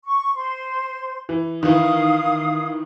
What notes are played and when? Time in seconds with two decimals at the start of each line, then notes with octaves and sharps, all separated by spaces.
0.06 C#6
0.35 C5 C6
1.29 E3
1.63 D#3 E3 F5 D#6